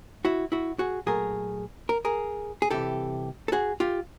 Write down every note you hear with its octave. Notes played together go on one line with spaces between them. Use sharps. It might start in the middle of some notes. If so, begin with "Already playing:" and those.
E4 F#4
E4 F#4
F#4 G#4
A#2 F#3 A3 G#4 A#4
A#4
G#4 A#4
G#4
C2 C3 E3 G4 A4
A4
F#4 G#4
F4 G4